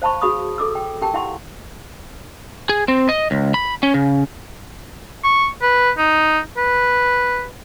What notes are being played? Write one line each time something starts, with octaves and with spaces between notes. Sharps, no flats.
C5 F5 A5 B5 C#6
F#4 G#4 F5 B5 C#6 D#6
A4 D6 E6
G5
G4 A#4 G5 A5
E4 F5 F#5 C6 C#6
G#4
C4
D#5
C#2
B5
C#4
C#3
C#6
B4
D#4
B4